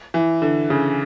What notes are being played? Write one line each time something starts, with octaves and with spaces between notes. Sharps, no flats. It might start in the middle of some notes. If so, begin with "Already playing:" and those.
E3
D3
C#3